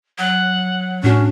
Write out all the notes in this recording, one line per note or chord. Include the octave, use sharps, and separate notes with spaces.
F#3 F#5
A2 C#4 D4 F#4